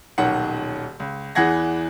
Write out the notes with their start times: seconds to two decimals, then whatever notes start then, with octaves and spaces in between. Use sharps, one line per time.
0.18 D#1 B1 D#3 F#5
1.00 C#2
1.35 E2 E3 G#4 F#5 G#6 A#6